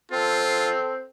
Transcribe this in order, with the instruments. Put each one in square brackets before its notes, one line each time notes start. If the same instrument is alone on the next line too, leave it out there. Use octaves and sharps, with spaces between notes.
[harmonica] C4 A4 [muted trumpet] F4